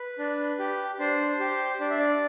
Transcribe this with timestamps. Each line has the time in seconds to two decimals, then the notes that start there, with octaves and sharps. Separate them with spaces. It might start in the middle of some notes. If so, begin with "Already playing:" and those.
Already playing: B4
0.18 D4
0.59 G4
0.99 D4 C5
1.40 G4
1.80 D4 D5
1.90 E5
1.99 D5